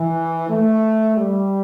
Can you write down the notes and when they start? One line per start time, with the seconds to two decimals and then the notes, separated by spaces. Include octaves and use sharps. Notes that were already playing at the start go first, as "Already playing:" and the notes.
Already playing: E3
0.49 A3
1.18 G3